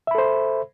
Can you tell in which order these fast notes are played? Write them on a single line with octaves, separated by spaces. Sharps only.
E5 B5 A4 C5